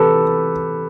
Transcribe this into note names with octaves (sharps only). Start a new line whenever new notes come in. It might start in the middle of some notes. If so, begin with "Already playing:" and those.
Already playing: C3 E3 G4 A4 B4